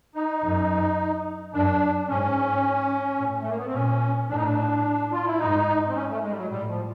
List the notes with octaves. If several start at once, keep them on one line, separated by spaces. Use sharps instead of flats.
D#4
F#2
F#2 D4
G#2 C#4
A2
A3
A#3
B3
C4
A#2 C#4
A2 D4
D#4
D4
F4
E4
G#2 D#4
C4
C#4
A3
G#3
G3
F#3
A2 G3
F3